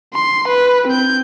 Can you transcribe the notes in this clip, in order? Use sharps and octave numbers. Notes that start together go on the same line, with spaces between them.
C6
B4
C4 G6